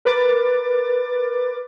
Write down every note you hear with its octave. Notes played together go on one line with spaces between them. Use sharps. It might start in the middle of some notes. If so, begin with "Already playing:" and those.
A#4 B4 D6 A6